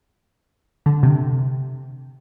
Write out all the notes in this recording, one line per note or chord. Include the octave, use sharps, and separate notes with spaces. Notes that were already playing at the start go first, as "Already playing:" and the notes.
D3
C3